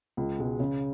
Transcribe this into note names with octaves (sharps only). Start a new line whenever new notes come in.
C#2
B2 G#3
C#3